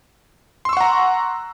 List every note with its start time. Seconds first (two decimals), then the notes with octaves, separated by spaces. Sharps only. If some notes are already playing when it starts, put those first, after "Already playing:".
0.65 C6
0.69 E6
0.73 C#6
0.77 F#5
0.81 A#5